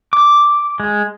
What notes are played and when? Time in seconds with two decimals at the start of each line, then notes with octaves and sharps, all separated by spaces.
0.13 D6
0.80 G#3